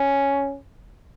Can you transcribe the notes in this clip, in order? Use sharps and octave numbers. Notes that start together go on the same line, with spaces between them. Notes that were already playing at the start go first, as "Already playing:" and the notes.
Already playing: C#4